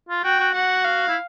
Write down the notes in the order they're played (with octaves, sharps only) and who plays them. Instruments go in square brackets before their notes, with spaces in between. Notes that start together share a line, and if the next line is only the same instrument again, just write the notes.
[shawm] F4
[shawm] F#4 [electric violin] G5
[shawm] F#4
[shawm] F#4 [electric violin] F#5
[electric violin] F5
[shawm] E4